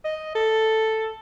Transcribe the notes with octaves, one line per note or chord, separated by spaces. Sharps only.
D#5
A4